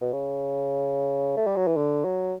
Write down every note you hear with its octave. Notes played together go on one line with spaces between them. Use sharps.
B2
C#3
A3
G3
F#3
E3
D3
F#3